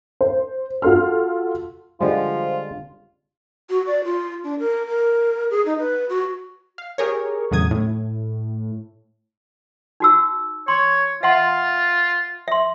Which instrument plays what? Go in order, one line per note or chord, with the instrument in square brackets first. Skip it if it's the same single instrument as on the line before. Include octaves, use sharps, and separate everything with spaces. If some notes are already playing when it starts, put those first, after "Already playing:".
[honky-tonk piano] C5
F4 F#4 A4 C6 F6
[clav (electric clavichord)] D3 G3 G#3 [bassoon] F3 [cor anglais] F4
[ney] F#4
D5
F4
D4
A#4
A#4
G#4
D#4
B4
F#4
[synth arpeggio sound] F5
G4 G#4 A#4 C#5
E2 A2 C#3 F#3 D#6 G#6
A2
[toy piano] D#4 F#4 E6
[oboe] C#5 [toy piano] C6
[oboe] F4 [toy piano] E5 F#5 C6
[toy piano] E5 C6